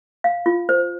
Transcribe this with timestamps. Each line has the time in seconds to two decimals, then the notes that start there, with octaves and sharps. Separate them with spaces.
0.24 F5
0.46 F4
0.69 C5